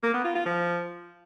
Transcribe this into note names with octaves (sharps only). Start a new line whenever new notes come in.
A#3
B3
F4
F4
F3